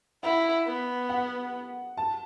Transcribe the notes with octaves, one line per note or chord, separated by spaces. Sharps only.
E4 F#5
B3
F#5
A5